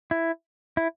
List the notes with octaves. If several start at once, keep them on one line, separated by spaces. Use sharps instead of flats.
E4
E4